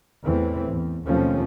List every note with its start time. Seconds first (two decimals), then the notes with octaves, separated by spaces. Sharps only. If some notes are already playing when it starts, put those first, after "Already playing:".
0.23 E2 A2 E3 C4
0.70 E2
1.05 D#2 B2 F3 A3 C4 C#4